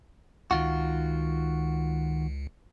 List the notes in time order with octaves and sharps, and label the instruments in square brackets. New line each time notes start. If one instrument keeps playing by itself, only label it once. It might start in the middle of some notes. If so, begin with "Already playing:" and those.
[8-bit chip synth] C#2 [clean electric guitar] D#3 F4 F#4